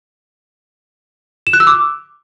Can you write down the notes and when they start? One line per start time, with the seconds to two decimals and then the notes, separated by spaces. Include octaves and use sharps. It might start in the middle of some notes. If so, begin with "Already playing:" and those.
1.47 E7
1.53 F#6
1.60 E6
1.67 D6